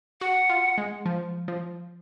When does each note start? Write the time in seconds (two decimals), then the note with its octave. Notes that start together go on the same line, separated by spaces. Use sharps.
0.21 F#4 F#5
0.49 F4
0.78 G#3
1.06 F3
1.48 F3